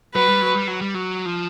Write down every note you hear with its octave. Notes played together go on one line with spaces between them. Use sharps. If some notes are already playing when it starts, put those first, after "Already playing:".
F#3 B4
G3
F#3
G3
F#3
G3
F#3
F3